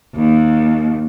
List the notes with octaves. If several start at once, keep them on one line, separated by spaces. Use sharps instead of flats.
D#2